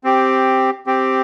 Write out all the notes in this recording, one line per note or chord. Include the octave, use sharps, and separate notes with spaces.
C4 G4
C4 G4